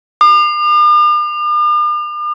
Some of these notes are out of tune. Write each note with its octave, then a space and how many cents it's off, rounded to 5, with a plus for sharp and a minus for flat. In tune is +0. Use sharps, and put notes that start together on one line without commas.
D6 +45